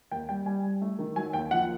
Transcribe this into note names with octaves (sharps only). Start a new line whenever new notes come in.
D#2 G5
G3 G5
G3 G#5
G3
A3
D#3
F#3 G#5
D#2 G5
F3 F#5